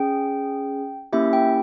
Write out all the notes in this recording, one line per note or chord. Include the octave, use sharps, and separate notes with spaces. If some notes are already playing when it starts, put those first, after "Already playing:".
Already playing: C#4 G#4 G5
A#3 C#4 E4 G4 E5
G5